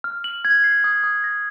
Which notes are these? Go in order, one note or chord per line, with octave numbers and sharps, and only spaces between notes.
F6
F#7
G#6
C7
D#6
D#6
A#6